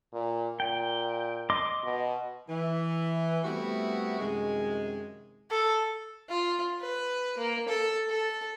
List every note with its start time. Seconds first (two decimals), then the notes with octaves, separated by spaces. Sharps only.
0.13 A#2
0.60 A#2 G5
1.50 D#5 C6 D6
1.84 B2
2.49 E3
3.45 G3 A3 B3 C4 E4 F#4
4.19 F#2 C3 D#3 G#3
5.51 A4
6.29 F4
6.81 B4
7.38 A#3
7.68 A4
8.10 A4